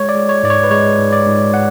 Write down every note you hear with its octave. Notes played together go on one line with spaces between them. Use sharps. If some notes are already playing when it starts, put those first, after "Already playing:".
Already playing: G#3 C#5
D5
G#3
C#5
G#2 D5
C#5
B4
G#3 C#5
G#2
D5
G#2
F#5